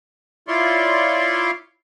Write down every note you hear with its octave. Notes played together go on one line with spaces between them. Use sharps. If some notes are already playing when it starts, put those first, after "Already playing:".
E4 F4 C#5 D5 C6